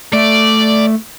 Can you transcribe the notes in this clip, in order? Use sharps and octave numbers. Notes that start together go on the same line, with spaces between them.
A3 D5